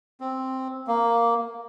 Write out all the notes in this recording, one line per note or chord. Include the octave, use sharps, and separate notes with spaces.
C4
A#3